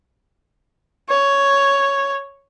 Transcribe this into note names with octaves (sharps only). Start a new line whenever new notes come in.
C#5